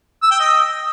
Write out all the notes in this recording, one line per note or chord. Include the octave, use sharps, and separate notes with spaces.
E6
G5
D#5